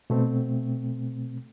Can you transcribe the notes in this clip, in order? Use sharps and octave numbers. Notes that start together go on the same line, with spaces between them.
B2 A3 C4